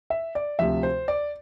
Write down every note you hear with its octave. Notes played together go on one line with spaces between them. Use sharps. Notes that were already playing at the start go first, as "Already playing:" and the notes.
E5
D5
D2 C3 F3 E5
C5
D5